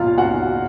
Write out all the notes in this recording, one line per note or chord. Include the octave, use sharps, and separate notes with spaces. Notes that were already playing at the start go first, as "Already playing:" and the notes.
Already playing: C#2 B2 F4 F5
F#4 F#5